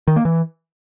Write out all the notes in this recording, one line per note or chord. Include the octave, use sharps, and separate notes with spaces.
D#3
A#3
E3